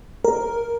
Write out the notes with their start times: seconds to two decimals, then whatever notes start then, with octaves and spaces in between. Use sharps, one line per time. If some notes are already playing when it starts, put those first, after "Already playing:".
0.25 A#4